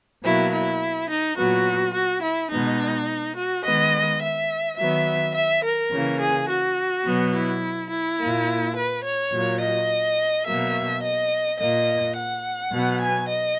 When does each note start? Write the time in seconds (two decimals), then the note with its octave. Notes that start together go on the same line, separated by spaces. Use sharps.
0.24 B2 F#3 A#3 E4
0.52 E4
1.09 D#4
1.37 A#2 F#3 B3 F#4
1.94 F#4
2.22 E4
2.51 B2 G#3 B3 D#4
3.36 F#4
3.64 D#3 G#3 B3 D#5
4.21 E5
4.78 D#3 F#3 B3 E5
5.35 E5
5.64 A#4
5.92 C#3 E3 A#3
6.20 G#4
6.49 F#4
7.05 B2 F#3 B3
7.33 E4
7.90 E4
8.19 A#2 A#3
8.76 B4
9.04 C#5
9.32 A#2 F#3 A#3
9.60 D#5
10.46 B2 F#3 A#3 E5
11.03 D#5
11.59 A#2 A#3 D#5
12.16 F#5
12.73 B2 F#3 B3
13.01 G#5
13.29 D#5